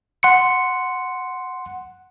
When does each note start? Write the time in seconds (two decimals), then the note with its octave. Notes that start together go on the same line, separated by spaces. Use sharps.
0.23 F#5 C6 C#7